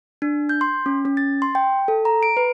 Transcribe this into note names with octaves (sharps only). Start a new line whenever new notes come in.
D4
G6
C6
C#4
C#4
A6
C6
G5
A4
A#5
D7
B4